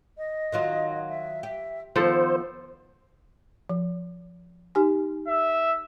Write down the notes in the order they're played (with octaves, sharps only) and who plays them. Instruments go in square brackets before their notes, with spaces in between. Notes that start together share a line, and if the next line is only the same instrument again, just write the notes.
[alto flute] D#5
[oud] D#3 F#3 F4
[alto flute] E5
[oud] G4 [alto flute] E5
[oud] D#3 [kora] F3 A4 [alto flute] B3 [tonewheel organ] C5
[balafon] F3
D#4 G4 G#5
[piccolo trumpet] E5